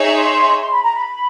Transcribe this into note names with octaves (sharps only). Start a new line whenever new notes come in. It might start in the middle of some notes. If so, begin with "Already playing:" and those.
Already playing: D#4 G#4 C#5 E5
C6
C6
B5
A#5
B5